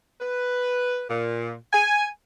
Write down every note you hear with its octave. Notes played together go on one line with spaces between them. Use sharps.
B4
A#2
G#5